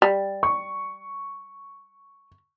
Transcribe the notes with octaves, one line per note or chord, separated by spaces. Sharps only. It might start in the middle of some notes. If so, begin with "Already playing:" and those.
G3
C#6